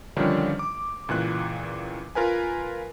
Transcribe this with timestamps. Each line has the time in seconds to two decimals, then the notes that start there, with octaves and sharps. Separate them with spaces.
0.17 D3 D#3 F3 G3 C#4 D4
0.59 D6
1.09 C#2 A#2 E3 F#6
2.15 F4 A#4 B4 G#5